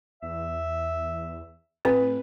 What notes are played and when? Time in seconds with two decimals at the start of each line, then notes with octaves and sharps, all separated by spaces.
0.23 E2 E5
1.85 A2 C4 B4